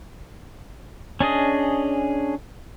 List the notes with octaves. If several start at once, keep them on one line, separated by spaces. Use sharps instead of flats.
C#4 D4 G#4 D#5